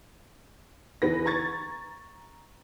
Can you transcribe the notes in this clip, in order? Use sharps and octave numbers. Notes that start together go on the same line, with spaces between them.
E2 E3 B4 A#6
A#5 C#6 G#6 A6